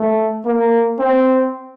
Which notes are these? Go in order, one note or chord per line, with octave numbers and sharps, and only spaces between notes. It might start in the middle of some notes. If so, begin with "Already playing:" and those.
Already playing: A3
A#3
C4